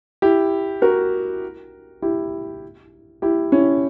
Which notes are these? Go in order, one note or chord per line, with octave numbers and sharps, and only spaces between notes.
E4 G4
F#4 A#4
E4 G4
E4 G4
C#4 E4